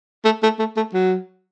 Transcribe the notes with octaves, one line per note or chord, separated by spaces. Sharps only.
A3
A3
A3
A3
F#3